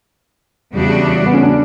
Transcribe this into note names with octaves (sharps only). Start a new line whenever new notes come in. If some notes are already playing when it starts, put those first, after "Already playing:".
E2 C#3 G3 D4 F#4
B3
C#4
D4